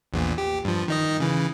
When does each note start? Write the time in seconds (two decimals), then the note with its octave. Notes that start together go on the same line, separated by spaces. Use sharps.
0.13 A#1 E2 A#2
0.38 G4
0.65 G2 F3
0.88 D#3 D#4 D#5
1.20 C#3 E3